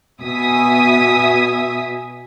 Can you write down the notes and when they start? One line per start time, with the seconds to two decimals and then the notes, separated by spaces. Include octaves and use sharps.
0.22 B2 E5 G#5 D#6 B6